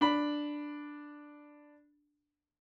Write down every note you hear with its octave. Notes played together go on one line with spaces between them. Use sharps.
D4 B5